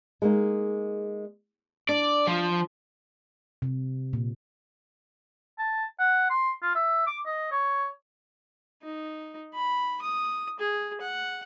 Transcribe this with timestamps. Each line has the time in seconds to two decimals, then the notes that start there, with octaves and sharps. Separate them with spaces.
0.22 G#3 A#3 D#4
1.89 D4 D5
2.27 F3
3.62 C3
4.13 A#2
5.59 A5
6.00 F#5
6.30 C6
6.63 F4
6.75 E5
7.07 D6
7.26 D#5
7.52 C#5
8.82 D#4
9.54 B5
10.02 D#6
10.59 G#4
11.01 F#5